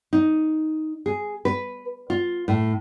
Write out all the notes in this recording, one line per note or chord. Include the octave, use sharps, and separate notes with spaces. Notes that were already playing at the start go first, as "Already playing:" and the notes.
D#4
G#4
B4
F4
A2